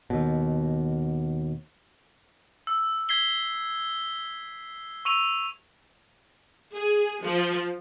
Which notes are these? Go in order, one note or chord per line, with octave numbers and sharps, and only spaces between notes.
D#2 B2
E6
G#6 B6 C7 G7
C#6 E6 D#7 F7
G#4
F3